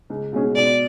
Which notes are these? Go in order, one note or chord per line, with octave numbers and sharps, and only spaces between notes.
C#2
B2 G#3 C#4 G#4
B2 D5